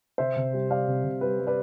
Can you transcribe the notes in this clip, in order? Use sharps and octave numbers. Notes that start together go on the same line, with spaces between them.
C3 C5 E5
C3
G3
G3 D5 F5
C3
C3
G3 B4
G3
B4 D5